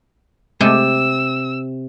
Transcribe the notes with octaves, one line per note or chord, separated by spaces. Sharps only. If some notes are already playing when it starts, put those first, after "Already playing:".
C3 G#3 A3 E6